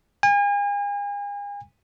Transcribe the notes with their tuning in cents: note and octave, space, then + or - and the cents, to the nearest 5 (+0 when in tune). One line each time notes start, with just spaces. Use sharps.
G#5 -40